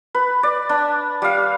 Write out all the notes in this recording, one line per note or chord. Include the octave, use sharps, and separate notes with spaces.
B4
D5
D4
G3 F5